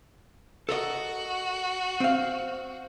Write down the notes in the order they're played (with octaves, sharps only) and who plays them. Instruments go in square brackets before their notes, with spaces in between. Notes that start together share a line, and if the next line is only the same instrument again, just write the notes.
[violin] F#4 [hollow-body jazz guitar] A4 A#4 D#5
[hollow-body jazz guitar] C4 F5